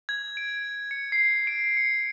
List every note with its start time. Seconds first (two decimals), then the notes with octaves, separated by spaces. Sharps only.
0.09 G#6
0.37 D7
0.91 C#7
1.12 C7
1.47 D7
1.77 C#7